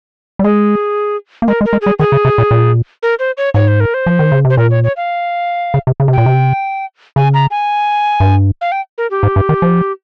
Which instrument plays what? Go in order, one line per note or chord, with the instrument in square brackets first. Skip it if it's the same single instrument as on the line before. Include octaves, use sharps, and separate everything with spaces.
[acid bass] G3
[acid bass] G#3 [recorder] G#4
[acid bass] A#3
[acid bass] G#3 [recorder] A#4
[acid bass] G#3
[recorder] A#4
[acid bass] G#3
[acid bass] G3 [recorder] G#4
[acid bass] D#3 [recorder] G#4
[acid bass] C#3
C3
A#2
A#2
[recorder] A#4
C5
C#5
[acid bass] G#2 [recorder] C#5
[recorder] C5
A#4
C5
[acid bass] F3
D#3
C#3
C3
[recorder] C5
[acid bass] A#2 [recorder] A#4
[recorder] C#5
C#5
F5
[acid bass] C#3
C3
C#3
C3
[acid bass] A#2 [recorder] G5
[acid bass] C3
[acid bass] C#3 [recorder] G#5
[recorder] A#5
G#5
[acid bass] G2
[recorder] F5
G5
A#4
G4
[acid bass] G#2
G2
D#3
F3